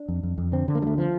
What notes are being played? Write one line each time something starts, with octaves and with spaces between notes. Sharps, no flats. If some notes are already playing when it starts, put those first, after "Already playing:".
Already playing: D4
F2
F2
F2
D3 C4
D3
A#3
D2 G3 A3
F3